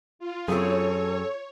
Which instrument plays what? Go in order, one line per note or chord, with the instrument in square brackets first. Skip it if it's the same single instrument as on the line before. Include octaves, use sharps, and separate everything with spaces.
[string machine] F4
[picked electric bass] F#2 [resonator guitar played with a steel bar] C4 G#4 [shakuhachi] A4 [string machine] C#5